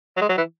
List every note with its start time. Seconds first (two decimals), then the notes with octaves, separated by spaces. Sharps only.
0.17 F#3
0.21 G#3
0.29 F#3
0.37 E3